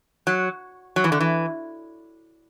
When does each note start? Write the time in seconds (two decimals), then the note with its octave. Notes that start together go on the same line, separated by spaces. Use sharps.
0.27 F#3
0.96 F#3
1.04 E3
1.12 D3
1.21 E3